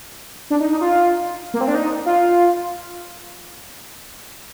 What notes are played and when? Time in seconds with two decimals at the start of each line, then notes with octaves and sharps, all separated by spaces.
0.50 D4
0.60 D#4
0.71 D#4
0.81 F4
1.54 A#3
1.61 C4
1.68 D4
1.75 D#4
2.06 F4